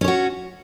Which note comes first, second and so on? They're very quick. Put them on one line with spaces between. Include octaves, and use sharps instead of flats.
C#4 C#5 F#4